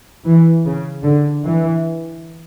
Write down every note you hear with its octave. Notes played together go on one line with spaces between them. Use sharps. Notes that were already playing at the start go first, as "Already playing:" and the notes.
E3
C#3
D3
E3